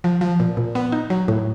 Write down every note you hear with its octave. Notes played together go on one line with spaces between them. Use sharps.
F3
F3
A#2
A#2
B3
D#4
F#3
A2